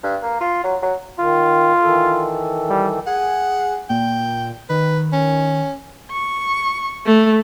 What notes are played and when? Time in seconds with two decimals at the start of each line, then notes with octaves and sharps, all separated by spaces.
0.04 G2
0.23 A#3
0.41 F4
0.64 F#3
0.83 F#3
1.20 D#3 F4
1.82 D#3 E3 A4
2.70 G3
3.07 G#4 F#5
3.90 A#2 G5
4.69 D#3 B4
5.13 C#4
6.11 C#6
7.06 A3